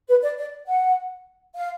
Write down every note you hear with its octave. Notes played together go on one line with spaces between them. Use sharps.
B4
D5
D5
F#5
F5